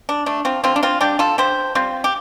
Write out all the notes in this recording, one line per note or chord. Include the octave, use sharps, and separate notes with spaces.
D4
A3 D4
C4 F4
D3 C4 F4
D4
C4 F4
G3 D4 G4
F4 A4
D3 G4 C5
G3 C4 F4
G4